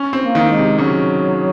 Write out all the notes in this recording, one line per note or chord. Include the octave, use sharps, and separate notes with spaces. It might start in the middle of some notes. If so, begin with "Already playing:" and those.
Already playing: C#4
C4
A#3
D#3
G#3
C3
C#3 F#3